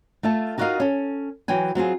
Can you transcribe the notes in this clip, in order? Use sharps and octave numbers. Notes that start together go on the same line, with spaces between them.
A3 F4 E5 A5
D#4 F4 F#4 A#4 D#5 F5
C#4 A4
E3 F#3 G5 G#5
F#3 C4 F4 G#4